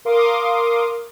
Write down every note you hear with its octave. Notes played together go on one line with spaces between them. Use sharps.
A#4 F5 C6 D6 D#6